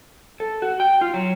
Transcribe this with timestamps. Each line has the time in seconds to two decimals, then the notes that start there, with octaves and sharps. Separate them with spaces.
0.40 A4
0.62 F#4
0.80 G5
1.01 F4
1.14 F#3